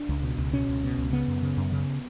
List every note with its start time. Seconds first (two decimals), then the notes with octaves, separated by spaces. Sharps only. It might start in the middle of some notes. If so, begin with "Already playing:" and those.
Already playing: D4
0.09 C#2
0.23 B2
0.38 C#2
0.53 B2 C#4
0.68 C#2
0.83 B2
0.98 C#2
1.13 C#3 B3
1.28 F#2
1.42 C#3
1.57 F#2
1.72 C#3